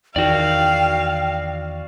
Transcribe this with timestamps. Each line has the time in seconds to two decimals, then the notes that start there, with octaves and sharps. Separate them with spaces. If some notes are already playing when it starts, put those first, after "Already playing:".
0.16 E2 D#3 F#4 D5 F5 G5